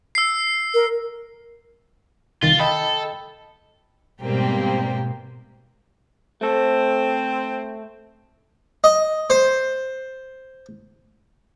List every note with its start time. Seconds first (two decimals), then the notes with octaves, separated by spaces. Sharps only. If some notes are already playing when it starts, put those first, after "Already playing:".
0.15 E6 C7
0.74 A#4
2.42 C2 D#3 F4 A6
2.60 A4 D#5 G5 B5
4.22 G#2 B2 G3 A#3 C4 G4
6.41 A3 C4 A4
8.84 D#5
9.30 C5